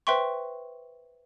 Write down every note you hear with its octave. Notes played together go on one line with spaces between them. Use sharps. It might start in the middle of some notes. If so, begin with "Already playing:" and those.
B4 C5 E5 G5 C6 C#6